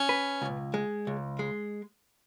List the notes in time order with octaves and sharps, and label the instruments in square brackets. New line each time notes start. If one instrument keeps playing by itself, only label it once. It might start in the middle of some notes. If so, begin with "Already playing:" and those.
Already playing: [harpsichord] C#4
[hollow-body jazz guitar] B4
C#2
G#3
C#2
G#3